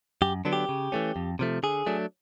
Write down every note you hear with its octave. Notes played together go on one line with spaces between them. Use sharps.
F#2 G4
D3 F#3 B3 D4
G4
C#3
E3 A3 C#4
F2
C3 F3 A3
D3 G#4
F#3 A3 D4